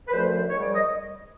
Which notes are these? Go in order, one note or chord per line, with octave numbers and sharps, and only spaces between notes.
B4
F#2 D3 F3 A3 C5
G#2 D#3 G3 C#5
D5
D#5